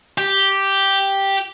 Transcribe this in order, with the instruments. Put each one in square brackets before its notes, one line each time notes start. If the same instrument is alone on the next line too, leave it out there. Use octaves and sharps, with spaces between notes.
[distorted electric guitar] G4